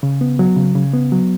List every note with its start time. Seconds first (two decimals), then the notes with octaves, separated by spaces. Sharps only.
0.03 C#3
0.21 B3
0.39 F#3
0.57 C#3
0.75 C#3
0.93 B3
1.12 F#3